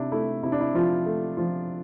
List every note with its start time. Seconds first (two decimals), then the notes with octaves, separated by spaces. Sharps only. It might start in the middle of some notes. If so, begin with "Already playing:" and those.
Already playing: C3 D4 E4
0.12 A3 E4
0.43 C3 E4
0.52 D4
0.61 E4
0.75 F3 F4
1.06 A3
1.37 F3 F4